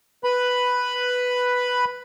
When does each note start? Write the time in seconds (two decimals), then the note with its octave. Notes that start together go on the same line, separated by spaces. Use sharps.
0.24 B4 B5